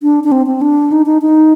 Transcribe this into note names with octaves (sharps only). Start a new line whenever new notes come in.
D4
D4
C4
C4
D4
D#4
D#4
D#4